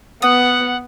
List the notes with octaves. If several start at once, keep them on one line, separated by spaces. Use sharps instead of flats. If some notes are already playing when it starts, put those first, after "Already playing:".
B3 F#5 D#6